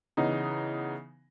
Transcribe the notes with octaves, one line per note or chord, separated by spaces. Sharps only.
C#3 E3 B3 D#4